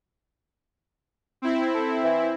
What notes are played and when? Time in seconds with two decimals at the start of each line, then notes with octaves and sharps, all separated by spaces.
1.42 C4 E4
1.74 A4
2.04 E3